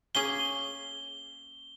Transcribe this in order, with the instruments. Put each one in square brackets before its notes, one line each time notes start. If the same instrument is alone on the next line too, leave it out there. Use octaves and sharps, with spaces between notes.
[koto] A#3 C#4 G#4 [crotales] G7